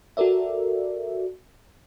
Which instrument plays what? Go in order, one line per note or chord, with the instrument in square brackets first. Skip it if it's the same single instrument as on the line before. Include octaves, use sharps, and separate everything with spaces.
[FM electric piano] F#4 A4 A#4 D5 E5